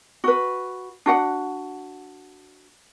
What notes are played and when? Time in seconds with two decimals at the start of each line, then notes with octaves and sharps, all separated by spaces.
0.24 F#4 B4
1.06 D4 F#4 F#5